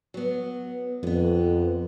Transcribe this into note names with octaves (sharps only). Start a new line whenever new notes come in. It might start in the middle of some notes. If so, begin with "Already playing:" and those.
F#3 B3
F2 D3 B3